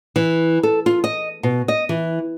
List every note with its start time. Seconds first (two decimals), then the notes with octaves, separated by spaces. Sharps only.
0.16 E3
0.63 A4
0.86 F4
1.04 D#5
1.43 B2
1.68 D#5
1.89 E3